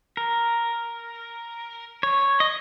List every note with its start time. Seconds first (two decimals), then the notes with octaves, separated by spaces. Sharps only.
0.17 A#4
2.03 C#5
2.40 D#5